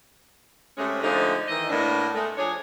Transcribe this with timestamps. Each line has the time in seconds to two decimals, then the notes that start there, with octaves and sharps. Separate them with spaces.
0.78 C3 G#3 A3 C#4
1.02 D3 F3 G#3 A3 D#4
1.48 D#3 E3 D#5
1.70 A2 A#3 B3 D4
2.15 G#3 A3
2.38 F3 D4 G#4 C#5